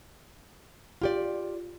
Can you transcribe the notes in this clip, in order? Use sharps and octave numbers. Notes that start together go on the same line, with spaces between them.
F4 G4 D5